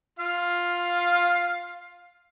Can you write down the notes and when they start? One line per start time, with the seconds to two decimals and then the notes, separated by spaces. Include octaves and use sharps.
0.19 F4 F5